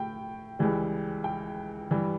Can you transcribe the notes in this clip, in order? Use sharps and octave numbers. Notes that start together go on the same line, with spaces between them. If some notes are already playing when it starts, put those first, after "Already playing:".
Already playing: A2 G5
C#2 C#3 E3 G3
G5
G2 E3 G3